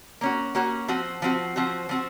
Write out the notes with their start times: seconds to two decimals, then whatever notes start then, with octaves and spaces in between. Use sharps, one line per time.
0.21 A#3 C#4 F#4
0.55 A#3 C#4 F#4
0.88 F3 C4 F#4
1.22 F3 C4 F#4
1.56 F3 C4 F#4
1.89 F3 C4 F#4